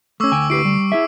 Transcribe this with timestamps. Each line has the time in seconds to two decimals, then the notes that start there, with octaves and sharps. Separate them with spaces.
0.20 A3 C#4 C#6 D6 E6
0.32 D2 G5 G#5
0.50 E4 G4 B4 C7 D7
0.65 G3
0.92 E4 G#4 E5